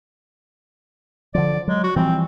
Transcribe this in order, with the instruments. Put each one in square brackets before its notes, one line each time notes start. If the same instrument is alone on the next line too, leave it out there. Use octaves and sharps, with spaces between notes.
[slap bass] D3 F3 [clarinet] D5
[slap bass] F#3 [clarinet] G#3
[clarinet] F#4
[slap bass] E3 F3 G3 [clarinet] C4